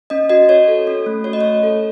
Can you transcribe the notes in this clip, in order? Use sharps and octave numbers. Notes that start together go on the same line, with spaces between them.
C#4 D#5
F#4 D#5
F#4 C#5
A4
C#4
A3
F#4 C#5
D#5
A3 C#5
A4